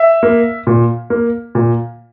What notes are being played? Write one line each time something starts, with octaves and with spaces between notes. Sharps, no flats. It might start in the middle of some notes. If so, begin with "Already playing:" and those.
Already playing: E5
A#3
A#2
A#3
A#2